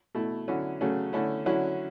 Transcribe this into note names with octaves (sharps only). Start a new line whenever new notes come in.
B2 A3 E4
D3 F#3 C#4 E4
C#3 F#3 A3 C#4
D3 A3 C#4 E4
D3 F#3 C#4 E4